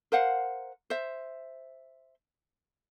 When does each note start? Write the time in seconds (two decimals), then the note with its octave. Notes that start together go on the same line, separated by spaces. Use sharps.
0.12 A#4 C5 F5 F#5
0.90 C5 E5